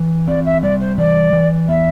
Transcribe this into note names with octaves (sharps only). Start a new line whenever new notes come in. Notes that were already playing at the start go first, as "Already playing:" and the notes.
Already playing: E3
C4 D5
E5
G3 D5
C5
E3 D5
E3
B3 E5